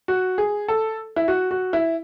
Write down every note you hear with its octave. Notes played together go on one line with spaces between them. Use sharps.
F#4
G#4
A4
E4
F#4
F#4
E4